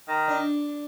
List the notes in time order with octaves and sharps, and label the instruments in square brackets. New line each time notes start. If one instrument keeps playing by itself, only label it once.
[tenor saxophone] D#3
[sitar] D4